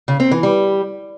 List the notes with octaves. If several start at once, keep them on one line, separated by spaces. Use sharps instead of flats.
C#3
C4
E3
G3